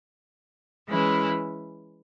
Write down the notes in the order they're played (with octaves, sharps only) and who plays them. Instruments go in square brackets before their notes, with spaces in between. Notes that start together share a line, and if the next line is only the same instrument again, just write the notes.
[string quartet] E3 G#3 C#4 E4